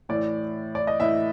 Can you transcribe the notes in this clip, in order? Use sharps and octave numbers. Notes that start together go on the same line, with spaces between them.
A2 E3 D5
D5
D#5
A2 E3 E5